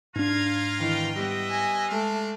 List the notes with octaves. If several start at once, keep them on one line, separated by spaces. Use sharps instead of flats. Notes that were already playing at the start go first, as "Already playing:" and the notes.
G#2 D4 F4 F5 A#5 G#6
E2 D#3 E3 G5
G3 B3 F#4 D#5 E5
G#5
G#3 A3 C4 D4 F5